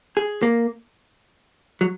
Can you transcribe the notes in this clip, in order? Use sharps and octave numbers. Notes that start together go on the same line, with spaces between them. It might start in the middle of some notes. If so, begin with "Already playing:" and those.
G#4
A#3
F#3